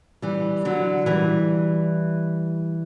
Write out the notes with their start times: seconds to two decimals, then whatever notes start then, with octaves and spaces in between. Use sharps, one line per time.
0.22 E3 G3
0.65 D3 F#3
1.06 E3 G3